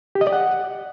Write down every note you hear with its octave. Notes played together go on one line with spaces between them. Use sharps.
G4
D#5
D5
F#5